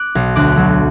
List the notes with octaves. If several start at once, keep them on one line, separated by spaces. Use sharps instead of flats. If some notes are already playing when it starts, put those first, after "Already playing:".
Already playing: D6 F#6
B1
D2 D6 F#6
F#3